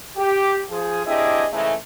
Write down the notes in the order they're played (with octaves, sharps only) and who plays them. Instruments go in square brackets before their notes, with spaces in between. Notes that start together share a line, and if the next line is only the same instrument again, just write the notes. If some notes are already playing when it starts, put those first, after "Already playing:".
[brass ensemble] G4
F3 G#4
C4 D4 E4 G4 G#4 D#5
G#2 C#3 E3 G#3 A3